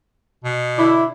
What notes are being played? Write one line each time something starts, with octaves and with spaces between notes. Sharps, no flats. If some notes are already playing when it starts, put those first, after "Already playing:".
B2
D3 D4 E4